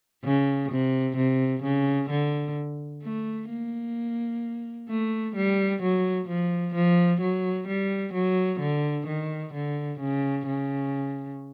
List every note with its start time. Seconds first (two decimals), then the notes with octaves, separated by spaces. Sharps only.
0.24 C#3
0.71 C3
1.17 C3
1.63 C#3
2.10 D3
3.03 A3
3.50 A#3
4.89 A3
5.36 G3
5.82 F#3
6.28 F3
6.75 F3
7.21 F#3
7.68 G3
8.14 F#3
8.60 D3
9.07 D#3
9.53 D3
10.00 C#3
10.46 C#3